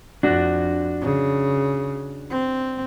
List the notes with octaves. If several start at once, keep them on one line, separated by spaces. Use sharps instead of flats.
F2 D4 F#4
C#3
C4